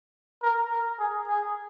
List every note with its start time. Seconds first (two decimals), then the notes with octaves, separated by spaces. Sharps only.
0.43 A#4
0.71 A#4
0.99 G#4
1.28 G#4